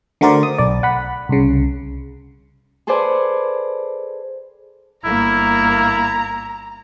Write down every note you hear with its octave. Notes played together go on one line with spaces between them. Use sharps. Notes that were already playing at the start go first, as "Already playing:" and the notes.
D3 A3 F#4 A#4 C5 D5
D#6
B1 D5
F#5 B5
C2 C#3
G#4 A4 B4 C5 D5 G#5
G1 A#3 E4 A#5